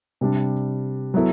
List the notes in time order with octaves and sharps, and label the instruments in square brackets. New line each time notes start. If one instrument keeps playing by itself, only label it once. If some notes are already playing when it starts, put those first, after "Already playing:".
[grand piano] C3 G3 D4
F#3 B3 E4 A4